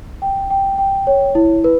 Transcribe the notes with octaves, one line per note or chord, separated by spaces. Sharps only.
G5
G5
G5
C#5
E4
B4